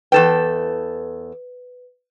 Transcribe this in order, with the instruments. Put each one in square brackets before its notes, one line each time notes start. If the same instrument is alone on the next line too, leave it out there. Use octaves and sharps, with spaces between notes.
[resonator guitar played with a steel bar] E2 A4 G5 [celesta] B4